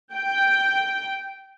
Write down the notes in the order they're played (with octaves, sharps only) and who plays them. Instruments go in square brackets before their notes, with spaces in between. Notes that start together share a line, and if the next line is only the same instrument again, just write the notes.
[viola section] G5